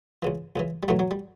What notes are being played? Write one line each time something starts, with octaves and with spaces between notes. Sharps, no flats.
C#2 C#3 E3
C#2 C#3 E3
G3
B1 A2 E3 F#3 A3
F#3
G3